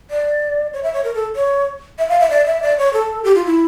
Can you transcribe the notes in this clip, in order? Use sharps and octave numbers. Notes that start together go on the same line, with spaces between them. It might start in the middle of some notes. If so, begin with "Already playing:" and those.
D5
C#5
E5
C#5
A#4
A4
C#5
E5
F5
E5
D5
E5
D5
C#5
A4
G4
F4
E4